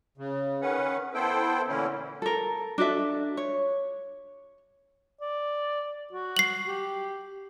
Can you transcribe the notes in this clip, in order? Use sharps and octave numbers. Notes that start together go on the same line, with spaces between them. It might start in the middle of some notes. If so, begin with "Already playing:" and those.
C#3
D#3 C#4 B4 F#5
B3 E4 A4 C5 G5
A#2 D3 E3 C#4 E4
A4 A#4
D4 F#4 A4 E5
C#5
D5
F#4
C7 F#7
G4